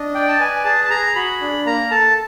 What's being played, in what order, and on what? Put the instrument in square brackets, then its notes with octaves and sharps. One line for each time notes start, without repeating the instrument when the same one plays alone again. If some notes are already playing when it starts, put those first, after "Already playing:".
Already playing: [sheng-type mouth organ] D4 D#5
[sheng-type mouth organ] D5 [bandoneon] G5
[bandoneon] A5
[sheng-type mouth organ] B4 [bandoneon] G#5
[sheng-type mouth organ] G#4 [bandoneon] A5
[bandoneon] A5
[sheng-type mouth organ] G#4 [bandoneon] A#5
[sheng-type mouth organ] F#4 [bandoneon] B5
[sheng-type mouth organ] D4
[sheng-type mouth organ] A#3 [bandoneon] A#5
[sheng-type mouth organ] A4 [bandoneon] A5